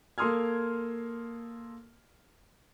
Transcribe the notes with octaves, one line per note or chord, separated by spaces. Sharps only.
A#3 A4 C6 D#6 F6 G#6